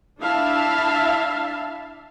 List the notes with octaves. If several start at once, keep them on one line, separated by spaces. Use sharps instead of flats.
D4 E4 E5 F5 A5